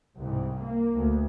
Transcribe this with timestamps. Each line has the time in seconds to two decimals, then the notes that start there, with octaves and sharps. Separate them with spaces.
0.18 C2 G#2
0.59 A#3
0.95 D2